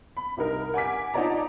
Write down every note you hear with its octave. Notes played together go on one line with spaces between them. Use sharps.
B5
C2 D#4 A#4
F#5 G#5 D6 B6
D#4 F4 C#5 D5 A5 A#5